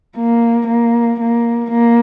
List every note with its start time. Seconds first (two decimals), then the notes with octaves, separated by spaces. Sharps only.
0.17 A#3
0.67 A#3
1.20 A#3
1.71 A#3